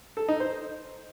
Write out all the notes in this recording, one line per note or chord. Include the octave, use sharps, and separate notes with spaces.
A4
D#4
C5